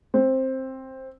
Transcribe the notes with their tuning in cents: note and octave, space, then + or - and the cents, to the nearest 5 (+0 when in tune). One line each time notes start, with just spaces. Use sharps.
C4 +10